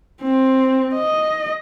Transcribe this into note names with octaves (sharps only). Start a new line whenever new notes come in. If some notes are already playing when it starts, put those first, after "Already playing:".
C4
D#5